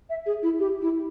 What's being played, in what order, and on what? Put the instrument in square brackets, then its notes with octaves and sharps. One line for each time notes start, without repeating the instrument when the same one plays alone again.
[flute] E5
G#4
E4
G4
E4